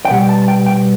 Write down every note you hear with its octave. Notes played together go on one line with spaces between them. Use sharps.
G5
B2 G3 B3 F#5
G5
A5
A5
G5
G5